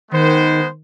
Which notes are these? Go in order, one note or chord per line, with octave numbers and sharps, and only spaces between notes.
D#3 G#3 B3 C5